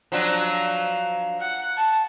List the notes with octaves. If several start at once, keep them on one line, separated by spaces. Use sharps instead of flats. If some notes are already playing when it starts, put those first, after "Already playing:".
F3 F#3 D4
F#5
A5